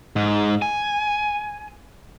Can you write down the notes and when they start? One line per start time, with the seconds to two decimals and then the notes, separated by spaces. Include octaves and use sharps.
0.16 G#2
0.62 G#5